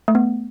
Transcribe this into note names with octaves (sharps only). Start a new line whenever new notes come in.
A3
B3